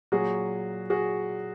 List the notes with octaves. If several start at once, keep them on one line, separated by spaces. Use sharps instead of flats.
A#2 F#3 F#4 G#4
F#4 G#4